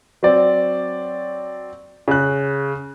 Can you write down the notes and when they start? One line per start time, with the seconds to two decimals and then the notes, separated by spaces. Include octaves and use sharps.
0.23 F#3 C4 D5
2.08 C#3 F#6